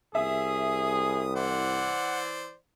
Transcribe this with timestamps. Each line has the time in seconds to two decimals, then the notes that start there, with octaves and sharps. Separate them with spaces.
0.15 C2 G#4 E5 D#6
1.36 E3 C5 D5 F#5